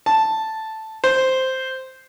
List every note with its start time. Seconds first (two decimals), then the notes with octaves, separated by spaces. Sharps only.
0.06 A5
1.04 C5